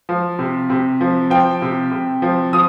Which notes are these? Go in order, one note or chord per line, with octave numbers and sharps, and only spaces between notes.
F3
C3
C3
F3
F3 G5
C3
C3
F3
F3 D#6